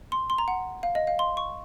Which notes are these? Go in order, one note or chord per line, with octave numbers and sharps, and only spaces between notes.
C6
C6
A#5
F#5
F5
D#5
F5
C6
C#6